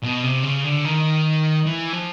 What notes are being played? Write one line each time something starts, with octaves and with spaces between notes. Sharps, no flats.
B2
C3
C#3
D3
D#3
E3
F3